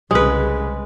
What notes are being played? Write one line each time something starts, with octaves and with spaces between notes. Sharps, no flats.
C2 C#3 G#3 B4